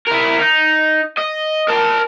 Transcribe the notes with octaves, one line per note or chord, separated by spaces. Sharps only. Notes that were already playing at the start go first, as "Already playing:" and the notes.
E4 A#4
D#4
D#5
A#4 A5